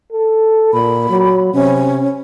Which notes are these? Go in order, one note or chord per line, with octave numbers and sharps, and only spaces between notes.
A4
A#2 B5
F#3
C3 C#4